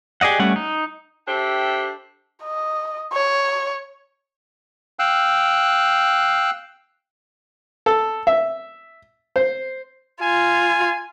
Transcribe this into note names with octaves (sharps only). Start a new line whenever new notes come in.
G4 G#4 D5 D#5 F#5
G3 A3 C#4 F#5
D#4
D4 G4 A4 C5 E5 G5
D#5
C#5
F5 G5 E6 F#6
A4
E5
C5
F4 G#5